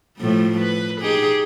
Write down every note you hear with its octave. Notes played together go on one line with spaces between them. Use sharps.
A2 F3 G3
B4
D#4 G4 G#4